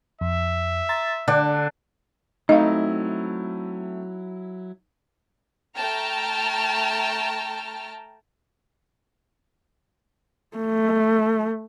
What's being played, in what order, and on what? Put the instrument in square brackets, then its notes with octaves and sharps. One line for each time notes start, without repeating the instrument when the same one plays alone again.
[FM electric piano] F2 [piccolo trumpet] E5
[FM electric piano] A#5 C6 A6
[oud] D3 [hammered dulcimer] D4 [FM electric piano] D5
[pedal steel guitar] F#3 E4 [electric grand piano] A3 C4 [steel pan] D#4 [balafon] D#5 F5
[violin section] A3 G5 A5 A#5 F6
[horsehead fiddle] A3